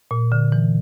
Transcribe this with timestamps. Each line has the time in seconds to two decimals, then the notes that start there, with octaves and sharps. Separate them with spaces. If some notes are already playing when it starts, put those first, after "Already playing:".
0.11 A#2
0.32 D3
0.52 E3